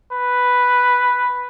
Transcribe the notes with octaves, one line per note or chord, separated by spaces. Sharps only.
B4